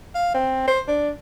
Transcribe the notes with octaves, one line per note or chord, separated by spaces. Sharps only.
F5
C4
C5
D4